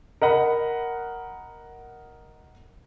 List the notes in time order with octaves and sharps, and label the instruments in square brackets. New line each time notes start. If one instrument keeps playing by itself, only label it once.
[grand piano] A#4 D#5 F#5 B5